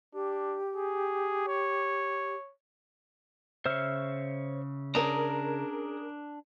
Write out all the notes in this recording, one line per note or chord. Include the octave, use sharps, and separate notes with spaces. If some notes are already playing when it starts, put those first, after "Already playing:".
D4 G4
G#4
C#5
C#3 C5 C#5 E5 F6
C#4 D4 G#4 A#4 A#5